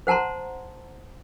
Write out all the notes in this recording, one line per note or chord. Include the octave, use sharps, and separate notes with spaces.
C5 F#5 A5 A#5 C6